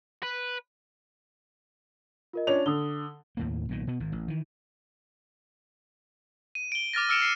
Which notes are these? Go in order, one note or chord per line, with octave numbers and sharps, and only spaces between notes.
B4
F4 A#4 D#5
C#4 D4 F4 C#5 D5 F7
D3 D#6 G7
D#2 A2 A#3
B1 A#2 D#3
B2 B3
G#1 G#2
A1
D#3 E3
D#7
D7 G7
D6 F6 A6 A#6
E6 F6 C#7 D7 E7
C7 D#7